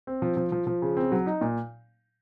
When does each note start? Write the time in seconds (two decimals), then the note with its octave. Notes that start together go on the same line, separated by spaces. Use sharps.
0.07 C4
0.22 F3
0.37 F3
0.52 F3
0.67 F3
0.82 C#3
0.97 C4
1.12 F#3
1.27 D#4
1.41 A#2